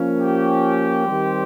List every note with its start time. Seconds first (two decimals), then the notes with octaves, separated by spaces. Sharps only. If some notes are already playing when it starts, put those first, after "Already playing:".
Already playing: F3 A#3 C#4
0.20 G4
1.05 D#3 G3 C4